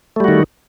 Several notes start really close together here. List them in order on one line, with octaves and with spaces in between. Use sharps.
A3 G3 F#4 D#3